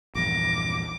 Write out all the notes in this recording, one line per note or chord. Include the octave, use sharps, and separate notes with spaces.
A#1 E2 G2 D6 A#6